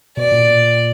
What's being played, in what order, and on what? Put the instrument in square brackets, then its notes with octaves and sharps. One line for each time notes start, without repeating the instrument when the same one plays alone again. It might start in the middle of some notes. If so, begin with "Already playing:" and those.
[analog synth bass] B2 [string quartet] D5
[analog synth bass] A#2